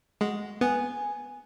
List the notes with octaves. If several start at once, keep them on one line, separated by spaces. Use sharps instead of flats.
G#3 F#4
B3 G#4